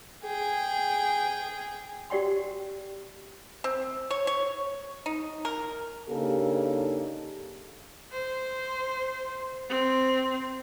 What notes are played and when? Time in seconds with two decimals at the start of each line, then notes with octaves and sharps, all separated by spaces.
0.24 G#4 G5
2.10 F#4 G4 D5 G5 C6
3.64 C4
4.11 C#5
4.27 C#5
5.06 D#4
5.45 A#4
6.10 C#3 A#3 D4 D#4 G4 A4
8.12 C5
9.69 C4